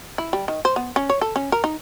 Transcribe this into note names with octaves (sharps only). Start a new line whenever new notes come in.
E4
G3
D#3
C5
B3
C#4
C#5
A4
C#4
A#4
D#4